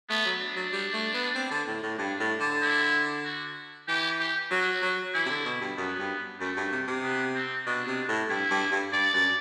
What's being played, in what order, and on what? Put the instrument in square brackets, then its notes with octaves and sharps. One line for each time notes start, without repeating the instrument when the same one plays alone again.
[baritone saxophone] A3 [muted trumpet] B3
[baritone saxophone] F#3
[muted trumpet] D4
[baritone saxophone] F#3
G3
A3
B3
C4
D3
A2
A2
[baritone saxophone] G2 [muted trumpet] D4
[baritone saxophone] A2
D3
[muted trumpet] E4
F#4
[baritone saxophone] E3 [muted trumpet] G4
[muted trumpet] G4
[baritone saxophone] F#3 [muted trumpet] F#4
[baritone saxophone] F#3
[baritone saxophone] E3 [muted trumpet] E4
[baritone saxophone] C3
D3
B2
G2
[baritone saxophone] F#2 [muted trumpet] B3
[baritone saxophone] G2
[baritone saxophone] F#2 [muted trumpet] A3
[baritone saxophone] G2
C3
C3
[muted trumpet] B3
C4
[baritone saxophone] B2 [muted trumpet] D4
[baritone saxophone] C3
A2
[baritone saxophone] G2 [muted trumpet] E4
[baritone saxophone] G2
G2
[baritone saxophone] G2 [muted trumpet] D5
[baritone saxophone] F#2